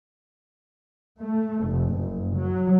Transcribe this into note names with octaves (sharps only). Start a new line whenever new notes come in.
A3
F1
F#1
F#3